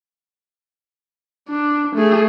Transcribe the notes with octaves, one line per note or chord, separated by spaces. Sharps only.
D4
A3 G#4